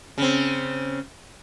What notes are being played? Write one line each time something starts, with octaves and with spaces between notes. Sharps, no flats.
C#3 C4